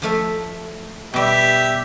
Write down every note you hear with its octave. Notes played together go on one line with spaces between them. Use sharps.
F3 A3 E5
B2 G3 G4 E5